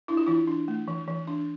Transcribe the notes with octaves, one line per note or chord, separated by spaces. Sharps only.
D4 E4
F4
E3 E4
D4
A3
E3
E3
D4